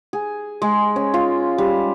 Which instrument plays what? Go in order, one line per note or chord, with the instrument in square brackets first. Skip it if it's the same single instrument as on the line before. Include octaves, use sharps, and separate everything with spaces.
[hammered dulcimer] G#4
G#3
C#4
F4
G3